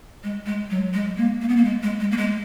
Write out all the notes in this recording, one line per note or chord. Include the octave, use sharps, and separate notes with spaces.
G#3
G#3
F#3
G#3
A#3
A#3
B3
A#3
G#3
G#3
G#3
A#3
G#3